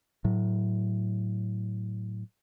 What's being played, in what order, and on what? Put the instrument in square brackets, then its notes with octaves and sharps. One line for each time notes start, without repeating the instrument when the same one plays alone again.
[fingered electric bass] A2 F#3